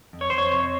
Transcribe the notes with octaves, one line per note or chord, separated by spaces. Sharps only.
F2
C#5
F2 C5
C#5
C3